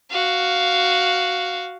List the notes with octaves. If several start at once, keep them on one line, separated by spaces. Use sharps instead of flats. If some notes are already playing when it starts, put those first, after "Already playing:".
F#4 F5